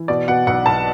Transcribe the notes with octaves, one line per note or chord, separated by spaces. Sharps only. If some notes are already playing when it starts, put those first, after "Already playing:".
Already playing: E3
B2 D5
B2 F#5
B1 F#5
B1 A5